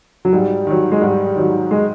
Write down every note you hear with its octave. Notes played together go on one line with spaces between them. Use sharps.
F#3
G#2 G3
D#3 F#3
G#3
G#2 G3
D#3 F#3
G#3